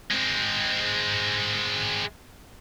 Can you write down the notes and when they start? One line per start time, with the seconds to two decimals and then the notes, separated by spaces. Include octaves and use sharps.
0.11 G#3 C4